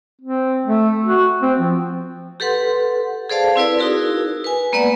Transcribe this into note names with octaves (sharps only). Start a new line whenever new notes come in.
C4
A3
F#4
C4
F3
G4 A4 B4 F#5 C6
G#4 A4 C5 D5 F5 A5
C4 E4 B4 D5
D#4 E4 F#4 G#4 A#4
B4 G#5
G#3 A#3 B3 B4 D5 F#5